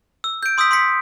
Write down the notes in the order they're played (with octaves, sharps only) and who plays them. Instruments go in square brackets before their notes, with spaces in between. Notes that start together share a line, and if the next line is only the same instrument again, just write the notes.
[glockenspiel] E6
G6 D7
C6 D#6 E6 G6 B6
C6 D#6 E6 B6 C#7